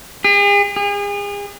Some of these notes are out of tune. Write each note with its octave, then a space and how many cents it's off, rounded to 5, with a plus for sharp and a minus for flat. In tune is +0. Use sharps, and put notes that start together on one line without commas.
G#4 -45
G#4 -40